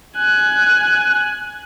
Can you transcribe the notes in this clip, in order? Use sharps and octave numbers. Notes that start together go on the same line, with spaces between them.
G#5 F#6